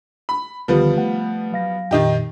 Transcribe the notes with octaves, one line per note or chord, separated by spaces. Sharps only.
B5
C#2 D3 D#3 F3 G3 B3
A3 F#5
F#3 F5 A#6
F2 A#2 D#3 D#4 G4